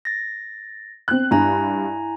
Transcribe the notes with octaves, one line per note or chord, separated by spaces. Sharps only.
A6 A#6
C4 F#6
G2 E4 G#5 A#5